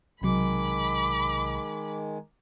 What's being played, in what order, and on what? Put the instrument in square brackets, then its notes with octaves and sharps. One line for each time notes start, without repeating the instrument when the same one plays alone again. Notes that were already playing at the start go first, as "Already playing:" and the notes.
[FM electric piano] B1 C3 F#3 [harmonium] D#3 G#3 [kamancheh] B5 D6